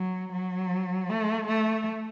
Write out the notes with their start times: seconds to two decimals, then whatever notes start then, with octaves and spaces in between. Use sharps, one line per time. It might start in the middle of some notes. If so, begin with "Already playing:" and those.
Already playing: F#3
0.32 F#3
1.09 A3
1.47 A3